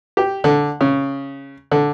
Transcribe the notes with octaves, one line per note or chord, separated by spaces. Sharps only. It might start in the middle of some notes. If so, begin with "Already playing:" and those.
G4
D3
C#3
D3